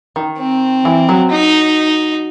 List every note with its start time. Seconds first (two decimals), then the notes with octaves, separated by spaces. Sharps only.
0.16 D#3
0.39 C4
0.85 E3
1.09 F#3
1.31 D#4